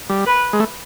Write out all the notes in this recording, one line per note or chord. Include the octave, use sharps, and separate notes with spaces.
G3
B4
G#3
A3